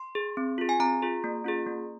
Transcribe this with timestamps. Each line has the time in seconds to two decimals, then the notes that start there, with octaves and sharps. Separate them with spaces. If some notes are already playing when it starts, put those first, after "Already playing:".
Already playing: C6
0.15 G#4
0.37 C4
0.58 F4 G#4
0.69 G#5
0.80 C4 A#5
1.02 F4 G#4
1.24 A#3
1.44 C#4 F4 G#4
1.67 A#3